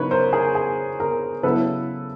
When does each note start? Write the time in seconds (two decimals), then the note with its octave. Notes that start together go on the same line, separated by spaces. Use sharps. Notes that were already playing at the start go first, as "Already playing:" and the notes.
Already playing: C#3 F#3 B3 D#4 A#4 B4 C#5
0.11 A#4 C5
0.33 G#4 A#4
0.55 G#4
1.00 G#4 A#4
1.43 C#3 F#3 B3 E4 A4 B4